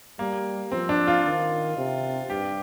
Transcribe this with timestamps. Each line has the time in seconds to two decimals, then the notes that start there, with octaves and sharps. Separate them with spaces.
0.19 G3 A#3
0.72 F3 C4
0.89 D4
1.07 F4
1.25 D#3
1.77 C3
2.30 G2 G4